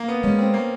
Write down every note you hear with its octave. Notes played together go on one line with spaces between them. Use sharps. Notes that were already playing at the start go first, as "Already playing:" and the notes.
Already playing: A#3
B3
G#3 C#4
C4
A#3